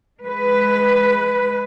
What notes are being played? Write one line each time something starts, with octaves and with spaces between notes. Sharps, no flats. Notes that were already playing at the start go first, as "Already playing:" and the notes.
G#3 B4